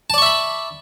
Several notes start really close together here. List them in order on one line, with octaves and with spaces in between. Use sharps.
A5 D5 C#6 E5 B5